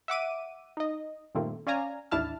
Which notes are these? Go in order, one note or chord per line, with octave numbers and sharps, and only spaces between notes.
E5 F#5 D6 D#7
D#4 D#5
G2 A#2 D#3 A3 A#3 C4
C#4 D5 F5 G#5 A#5
A1 D#2 D4 E4 A5 F6